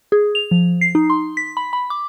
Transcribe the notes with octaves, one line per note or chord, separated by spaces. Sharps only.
G#4
F7
F3
C7
D#4
C6
B6
B5
B5
D6